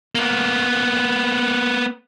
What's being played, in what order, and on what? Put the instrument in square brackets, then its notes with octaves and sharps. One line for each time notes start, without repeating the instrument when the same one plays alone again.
[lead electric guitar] A#3 B3